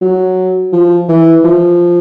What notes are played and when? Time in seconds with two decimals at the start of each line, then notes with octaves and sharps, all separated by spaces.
0.01 F#3
0.73 F3
1.08 E3
1.44 F3